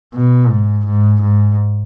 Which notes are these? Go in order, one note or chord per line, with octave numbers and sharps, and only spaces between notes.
B2
G#2
G#2
G#2